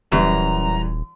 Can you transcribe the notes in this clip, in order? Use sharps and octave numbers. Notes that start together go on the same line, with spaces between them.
D#1 F#2 E3 G3 A#5